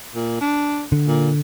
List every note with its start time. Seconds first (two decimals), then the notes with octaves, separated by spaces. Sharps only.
0.15 A#2
0.41 D4
0.92 D3
1.07 A#2